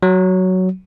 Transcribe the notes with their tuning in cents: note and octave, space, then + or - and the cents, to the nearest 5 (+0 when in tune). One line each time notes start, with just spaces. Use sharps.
F#3 +5